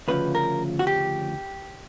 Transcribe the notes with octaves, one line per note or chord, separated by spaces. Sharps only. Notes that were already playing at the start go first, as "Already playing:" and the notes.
D2 C#3 F3 B4
A#4
F#4
G4